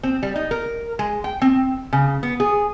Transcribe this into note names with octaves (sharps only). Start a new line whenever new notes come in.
C4
G3
D#4
A#4
G#3
G5
C4
C#3
B3
G#4